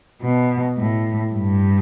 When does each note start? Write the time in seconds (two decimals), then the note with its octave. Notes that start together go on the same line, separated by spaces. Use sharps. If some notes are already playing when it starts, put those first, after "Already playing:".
0.22 B2
0.77 A2
1.33 G2